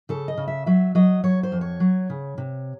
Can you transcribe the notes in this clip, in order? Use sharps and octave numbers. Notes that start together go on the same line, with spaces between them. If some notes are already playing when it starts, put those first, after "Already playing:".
C#3 A4
D#5
C#3
E5
F#3 E5
F#3 D#5
F#3 C#5
C5
F2
C#5
F#3
C#3
C3